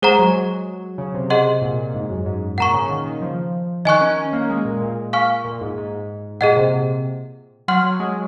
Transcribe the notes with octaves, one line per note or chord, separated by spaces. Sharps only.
G#3 G#4 C5 F#5 A#5
F#3
C#3
C3
G#4 D#5 F#5 C6
A#2
A#2
G#2
F#2
G#2
A#2 F#5 A#5 C#6
C#3
D#3
D#3
F3
D#3 D#5 G#5 C#6 F#6
C#4
C#4
A#3
G#3
A#2
A#2
F5 G#5 C#6 F6
A#2
G#2
G#2
A#2 G#4 D#5 F#5
C3
F#3 F#5 C6 F6
F#3
G#3